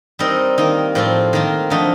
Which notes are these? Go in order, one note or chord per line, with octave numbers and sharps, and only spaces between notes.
G3 C4 D#4 A#4
D#3 A#3 D#4
A2 F3 C4 F4
D#3 A#3 F4
D3 F3 A3 D#4